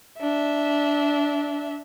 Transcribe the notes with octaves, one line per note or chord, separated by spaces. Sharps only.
D4 E5